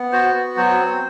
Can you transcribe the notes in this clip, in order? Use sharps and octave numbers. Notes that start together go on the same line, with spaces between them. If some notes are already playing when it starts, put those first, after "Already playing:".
Already playing: B3
F#4 C5
B3
F#3 C5
C4